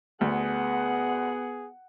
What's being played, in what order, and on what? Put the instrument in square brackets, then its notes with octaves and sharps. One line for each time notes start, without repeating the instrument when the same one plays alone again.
[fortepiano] D2 [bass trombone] B3 [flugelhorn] G#4 [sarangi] F#5